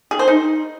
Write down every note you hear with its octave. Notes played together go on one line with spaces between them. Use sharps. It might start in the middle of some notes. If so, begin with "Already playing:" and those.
G#4
C5
D#4